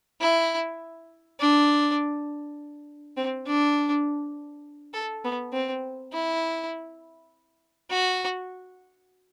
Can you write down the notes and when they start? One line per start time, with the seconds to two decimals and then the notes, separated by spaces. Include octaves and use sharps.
0.21 E4
1.40 D4
3.17 C4
3.46 D4
4.94 A4
5.24 B3
5.53 C4
6.13 E4
7.90 F#4